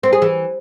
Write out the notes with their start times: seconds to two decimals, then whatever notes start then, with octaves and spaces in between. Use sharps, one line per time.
0.03 C4
0.13 G#4
0.22 E3